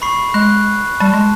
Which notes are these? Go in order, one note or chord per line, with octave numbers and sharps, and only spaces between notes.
B5 C#6 C7
G#3 F#6
G3 A5
G#3